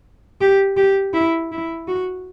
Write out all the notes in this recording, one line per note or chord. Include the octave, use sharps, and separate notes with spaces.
G4
G4
E4
E4
F#4